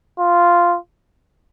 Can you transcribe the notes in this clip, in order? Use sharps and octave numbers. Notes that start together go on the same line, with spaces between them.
F4